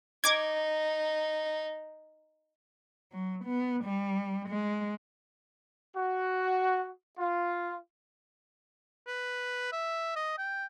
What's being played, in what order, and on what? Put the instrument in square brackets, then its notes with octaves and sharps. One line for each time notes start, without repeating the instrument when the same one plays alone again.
[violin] D#4 [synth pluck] D6 G#6
[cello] F#3
B3
G3
G#3
[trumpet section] F#4
F4
[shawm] B4
E5
D#5
G5